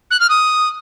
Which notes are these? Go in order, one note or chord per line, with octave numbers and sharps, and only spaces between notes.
F#6
F6
D#6